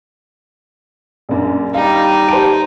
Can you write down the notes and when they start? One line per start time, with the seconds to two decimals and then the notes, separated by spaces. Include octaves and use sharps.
1.29 A#1 F#2 D4
1.74 G3 D#4 F5
2.28 G4 C5 A5 D7